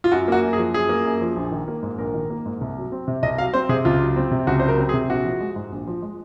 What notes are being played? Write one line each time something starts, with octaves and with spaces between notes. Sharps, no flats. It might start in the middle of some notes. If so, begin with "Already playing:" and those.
F4
F#2 F#4
A#3 F#4
F#2
G#4
F3
F#2 G#4
A#3
F#2
F3
A#1
D#3
A#3
G#2
A#1 A#4
D#3
A#3
G#2
C2
F#3
C4
C3
C2 D#5
F#3 F5
C4 C5
C3 G#4
C#2 F4
F#3
C4
C3
C#2 F#4
C5
F#3
A#4
C4
G#4
C3
A#1 F#4
F3
G#3
G#2
A#1
F3
G#3